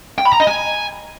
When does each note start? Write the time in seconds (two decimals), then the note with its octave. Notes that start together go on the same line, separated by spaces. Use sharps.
0.18 G5
0.25 B5
0.33 A#5
0.40 D#5
0.47 G#5